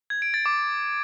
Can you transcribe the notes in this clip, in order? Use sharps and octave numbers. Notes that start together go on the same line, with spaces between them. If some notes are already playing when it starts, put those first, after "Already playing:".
G#6
D7
A6
D6